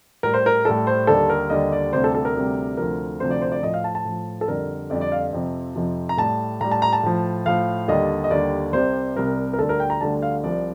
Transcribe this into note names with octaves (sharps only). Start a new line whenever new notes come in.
A2 G3 A#4
C5
A#4
A2 G3 A4
C5
D#2 D3 G3 A4
A#4
D#2 D3 G3 D#5
D5
D2 C3 G3 C5
A4
A4
A#4
D2 C3 G3
D2 C3 F3 A#4
D2 C3 F3 C5
D5
C5
D5
A2 F3 D#5
F5
A5
A5
A2 F3
A4
F2 D3 G3 A#4
F2 D3 G3 D5
D5
F5
F2 C3 F3
F2 C3 F3
A#5
A2 G3 A5
A2 G3 A#5
A5
A#5
A5
A2 F3
A2 F3 F5
D#2 D3 G3 D#5
D#5
D#2 D3 G3 D5
C2 C3 G3 C5
C2 C3 G3 A#4
A#4
D2 D3 G3 A4
A#4
G5
A#5
D2 D3 G3 A5
F5
C2 C3 F3 D5